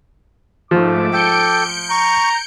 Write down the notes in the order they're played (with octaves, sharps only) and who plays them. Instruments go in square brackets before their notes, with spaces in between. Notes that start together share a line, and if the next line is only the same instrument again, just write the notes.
[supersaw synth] G#2 A3 [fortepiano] F3 [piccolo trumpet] D6
[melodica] A4 G5 [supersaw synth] G6 C#7 D7
[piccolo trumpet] A#5 [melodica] C#6